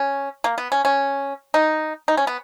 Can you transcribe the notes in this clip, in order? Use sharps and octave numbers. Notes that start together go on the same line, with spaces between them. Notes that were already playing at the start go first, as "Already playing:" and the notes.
Already playing: C#4
A#3
B3
C#4
C#4
D#4
D#4
C#4
B3